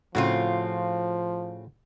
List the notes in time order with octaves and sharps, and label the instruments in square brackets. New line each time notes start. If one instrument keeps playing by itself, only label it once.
[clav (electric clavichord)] A2 F#4 [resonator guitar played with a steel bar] C#3 C4 F4 [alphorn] F3